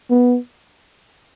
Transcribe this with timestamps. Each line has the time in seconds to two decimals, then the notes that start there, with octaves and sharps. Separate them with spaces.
0.10 B3